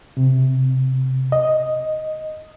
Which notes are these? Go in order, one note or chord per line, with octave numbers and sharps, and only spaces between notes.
C3
D#5